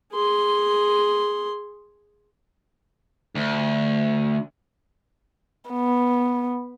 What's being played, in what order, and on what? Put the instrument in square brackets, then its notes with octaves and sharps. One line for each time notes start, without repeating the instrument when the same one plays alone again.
[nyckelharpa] G#4 C6
[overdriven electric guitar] D2
[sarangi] B3